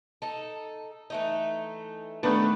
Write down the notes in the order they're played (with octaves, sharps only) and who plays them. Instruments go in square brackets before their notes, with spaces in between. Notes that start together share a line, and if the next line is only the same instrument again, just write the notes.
[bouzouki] D#4 A4
E3 A3 D#4
[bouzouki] D#3 B4 [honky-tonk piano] A3 D4 [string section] B3